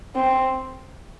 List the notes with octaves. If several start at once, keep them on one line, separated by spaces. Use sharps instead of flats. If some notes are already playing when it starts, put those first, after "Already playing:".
C4